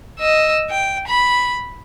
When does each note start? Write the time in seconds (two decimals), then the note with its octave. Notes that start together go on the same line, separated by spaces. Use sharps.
0.19 D#5 E6
0.71 G5
1.07 B5